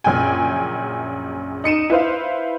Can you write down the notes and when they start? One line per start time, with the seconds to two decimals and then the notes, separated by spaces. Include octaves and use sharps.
0.04 A#1 F#2 C#3 G5 G#5
1.64 D#4 C#7 D#7 E7
1.90 E4 B4 C5 F5